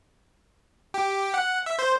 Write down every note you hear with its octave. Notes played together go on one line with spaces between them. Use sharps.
G4
F#5
E5
C5